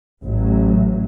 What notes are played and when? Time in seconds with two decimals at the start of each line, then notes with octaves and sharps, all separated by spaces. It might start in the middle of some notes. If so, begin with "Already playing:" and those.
0.22 A1 A2 F#3